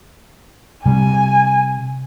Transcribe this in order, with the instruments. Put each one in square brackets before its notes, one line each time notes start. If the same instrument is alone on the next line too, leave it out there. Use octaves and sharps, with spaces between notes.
[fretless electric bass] C3 G3 [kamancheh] G#5